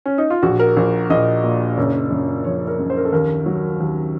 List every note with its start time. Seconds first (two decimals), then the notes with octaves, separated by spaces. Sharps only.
0.06 C#4
0.18 D#4
0.30 F4
0.43 A#1 F#4
0.60 A#4
0.77 A#1
1.10 A#1 D#5
1.43 A#2
1.78 F#1 C#5
2.11 F#2
2.44 F3 C#5
2.67 A#4
2.79 F#2
2.90 C5
2.97 A#4
3.05 A4
3.12 D#2 A#4
3.46 F#3
3.80 D#2